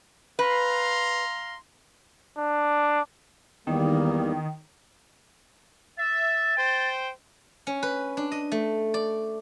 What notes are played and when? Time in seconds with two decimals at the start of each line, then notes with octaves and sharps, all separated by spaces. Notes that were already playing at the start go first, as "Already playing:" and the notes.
0.39 B4 F5 A#5 C6
2.38 D4
3.67 E2 D#3 G3 A#3
5.98 E5 A6
6.57 C5 G5
7.67 C#4
7.83 B4
8.17 D4
8.32 D#5
8.52 A3
8.94 D5